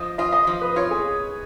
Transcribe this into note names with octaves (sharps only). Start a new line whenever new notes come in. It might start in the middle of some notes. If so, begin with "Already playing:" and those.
Already playing: F3 D#5
F4 D#5
D#5
F3
B4
F4 C#5
G#4